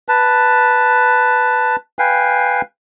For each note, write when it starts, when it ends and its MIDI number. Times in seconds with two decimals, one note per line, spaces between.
0.09 1.76 71
0.09 1.76 81
1.99 2.61 71
1.99 2.61 77
1.99 2.61 79
1.99 2.61 80